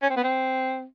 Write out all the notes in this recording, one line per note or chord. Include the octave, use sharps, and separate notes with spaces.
C#4
C4
B3
C4